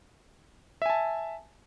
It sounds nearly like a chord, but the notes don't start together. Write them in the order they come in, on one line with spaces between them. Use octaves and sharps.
E5 G#5 A5